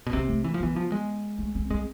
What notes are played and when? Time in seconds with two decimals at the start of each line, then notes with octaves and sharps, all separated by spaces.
0.07 B2
0.13 C3 C4
0.28 A3
0.44 E3
0.54 F3
0.60 E3 B3
0.76 F3
0.92 G#3
1.38 A3
1.55 C4
1.70 G#3 C4